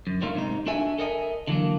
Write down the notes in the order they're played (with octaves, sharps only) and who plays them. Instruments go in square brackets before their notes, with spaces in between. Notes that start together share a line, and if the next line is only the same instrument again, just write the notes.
[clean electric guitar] F#2
G2 A#2 D#3 F#3 A3 F4
G#2 C3 D#4
D4 F#4 A4 E5 G#5
A4 A#4 D#5 E5 F#5 G#5
D3 E3 F#3 A#3